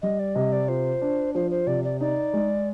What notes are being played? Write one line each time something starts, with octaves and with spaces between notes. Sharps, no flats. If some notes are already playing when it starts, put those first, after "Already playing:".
G3 D#5
D5
C3 D#5
D5
F4 C5
D4
F3 C5
C5
C3 D5
D5
D#4 D5
G#3